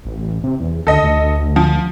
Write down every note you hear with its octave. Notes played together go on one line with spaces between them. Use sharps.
A1
C3
E2
D2 A4 D#5
D2
F3